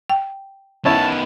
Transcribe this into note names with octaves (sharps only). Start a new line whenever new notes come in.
G5
D#3 B3 C#4 E4 A5